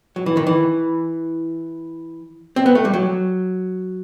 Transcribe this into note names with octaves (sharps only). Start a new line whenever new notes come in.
F#3
E3
D#3
E3
C4
B3
A3
G3
F#3